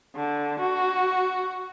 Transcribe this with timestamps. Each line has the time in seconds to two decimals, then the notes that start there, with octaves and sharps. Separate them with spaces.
0.16 D3
0.60 F#4